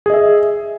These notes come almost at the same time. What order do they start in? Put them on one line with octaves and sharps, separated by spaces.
G#4 D#5 E5